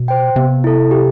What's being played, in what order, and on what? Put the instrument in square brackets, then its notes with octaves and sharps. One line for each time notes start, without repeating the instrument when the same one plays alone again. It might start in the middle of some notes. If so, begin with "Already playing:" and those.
Already playing: [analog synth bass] B2
[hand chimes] C5 G5
[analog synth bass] C3 [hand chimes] B3
[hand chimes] E4 A4
G4